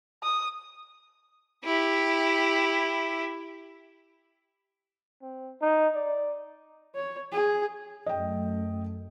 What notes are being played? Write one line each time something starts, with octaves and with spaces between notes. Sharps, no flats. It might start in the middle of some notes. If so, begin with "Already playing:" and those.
D#6
E4 G4
C4
D#4
D5
C#5
G#4
F#2 A3 D#5 G5